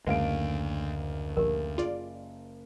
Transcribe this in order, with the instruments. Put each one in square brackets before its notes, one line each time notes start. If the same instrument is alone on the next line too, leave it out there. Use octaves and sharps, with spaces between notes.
[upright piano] F#1 F5 D7 [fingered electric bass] D2 [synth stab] G#3
[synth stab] A#1 [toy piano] G4 A#4
[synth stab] F4 D5 [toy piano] G#4